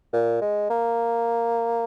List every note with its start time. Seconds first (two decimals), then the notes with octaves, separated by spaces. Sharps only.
0.13 A#2
0.41 G#3
0.70 A#3